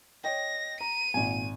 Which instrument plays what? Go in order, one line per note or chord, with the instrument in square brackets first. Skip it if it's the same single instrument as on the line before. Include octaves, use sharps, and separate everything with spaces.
[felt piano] C#5 D#5 G5 [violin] A#6
[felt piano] A#5 [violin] D#7
[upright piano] G#1 G#5 [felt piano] A#2